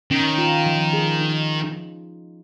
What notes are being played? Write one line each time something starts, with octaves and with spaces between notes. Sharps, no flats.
D#3 C#4
F4
F3
G#4
D#4